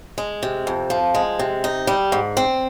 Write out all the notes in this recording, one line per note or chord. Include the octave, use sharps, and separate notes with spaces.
G#3
C3
F2
F3
G#3
C3
D#4
G3
G#2
C4